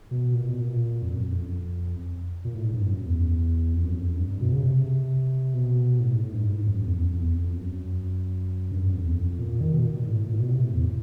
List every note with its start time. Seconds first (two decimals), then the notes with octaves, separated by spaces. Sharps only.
0.11 B2
0.34 A#2
0.48 B2
0.61 A#2
1.02 F2
1.14 F#2
1.27 F2
2.45 A#2
2.54 A2
2.64 G#2
2.74 G2
2.83 F#2
3.06 E2
3.74 F2
3.84 F#2
3.96 F2
4.18 G2
4.30 G2
4.41 B2
4.53 C#3
4.64 C3
5.54 B2
6.00 A2
6.14 G#2
6.22 A2
6.33 G2
6.44 G#2
6.67 F#2
6.85 E2
6.90 F2
6.97 E2
7.05 F2
7.20 E2
7.35 F2
7.57 F#2
8.71 G2
8.82 F#2
8.93 F2
9.05 E2
9.16 F2
9.39 A#2
9.61 D#3
9.72 B2
9.83 A#2
9.96 A#2
10.06 G#2
10.17 A2
10.29 A#2
10.40 B2
10.51 C3
10.64 A2
10.74 E2